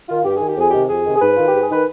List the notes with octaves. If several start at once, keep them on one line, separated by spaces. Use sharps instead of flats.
D#3 F4
G2 G4
D#3 G#4
G4
F2 G#4
C3 D#3 G4
F2 G#4
C3 D#3
G#4
G#2 B4
D#3 F4
G4
G#2
G#4
D#3 B4